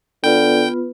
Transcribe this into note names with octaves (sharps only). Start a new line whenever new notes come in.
D3 B3 F4 B4 G5